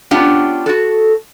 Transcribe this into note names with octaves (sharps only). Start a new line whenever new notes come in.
B3 C#4 D4 F4 G4 F#5
F#4 A4